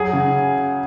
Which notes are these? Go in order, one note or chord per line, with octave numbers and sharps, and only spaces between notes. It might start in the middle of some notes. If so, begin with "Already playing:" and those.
Already playing: F#3 G#4
C#3